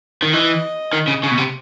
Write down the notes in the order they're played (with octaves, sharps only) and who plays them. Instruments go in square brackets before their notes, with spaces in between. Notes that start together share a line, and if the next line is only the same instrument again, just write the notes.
[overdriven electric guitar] D#3
[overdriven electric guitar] E3 [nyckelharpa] D#5
[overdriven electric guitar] D#3
C#3
C#3
B2
C3